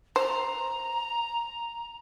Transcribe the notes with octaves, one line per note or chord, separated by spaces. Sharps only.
C5 A#5